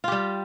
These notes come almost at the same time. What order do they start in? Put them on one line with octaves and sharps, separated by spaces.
F4 G4 G3